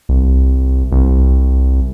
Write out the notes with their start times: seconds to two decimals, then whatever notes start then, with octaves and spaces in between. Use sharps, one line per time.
0.09 C2
0.92 C2